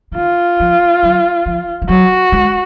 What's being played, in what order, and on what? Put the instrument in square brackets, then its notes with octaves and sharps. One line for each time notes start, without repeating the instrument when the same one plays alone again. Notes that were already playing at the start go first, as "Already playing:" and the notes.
[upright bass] C#3
[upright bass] D#3 [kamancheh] F4
[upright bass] F3
F#3
F3
F3
[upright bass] F#3 [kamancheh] F#4
[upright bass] G#3